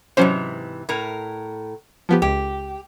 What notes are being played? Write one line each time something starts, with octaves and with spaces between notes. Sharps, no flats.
G#2 C3 E3 F#3 C#4 C5
A2 A#4
F3 B3 G4
C#2 G4